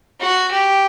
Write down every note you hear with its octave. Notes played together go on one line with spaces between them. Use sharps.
F#4
G4